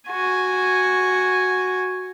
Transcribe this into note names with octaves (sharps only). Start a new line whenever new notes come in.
F#4 G#5